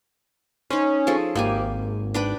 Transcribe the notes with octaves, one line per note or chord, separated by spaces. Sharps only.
C#4 D#4 C5
F3 G#4 A4
G#1 A#3 G4 G#5
D4 B4 G5